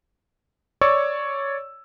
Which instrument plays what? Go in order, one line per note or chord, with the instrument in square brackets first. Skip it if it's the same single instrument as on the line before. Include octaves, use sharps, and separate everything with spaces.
[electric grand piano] C#5 D5 C#6 E6